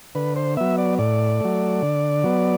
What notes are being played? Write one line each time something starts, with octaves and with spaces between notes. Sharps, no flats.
D3 B4
C5
F#3 B3 E5
D5
A2 D5
F#3 A3
D3
F#3 B3